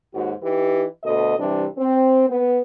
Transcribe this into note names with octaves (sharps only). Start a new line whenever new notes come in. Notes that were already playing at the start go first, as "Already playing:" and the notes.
D#2 G#2 F#4
E3 D#4 G4
D2 B2 A4 D#5
C3 E3 G3 D4
C4
B3